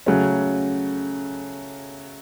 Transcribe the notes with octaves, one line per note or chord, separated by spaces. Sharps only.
C#3 F#3 A3 C#4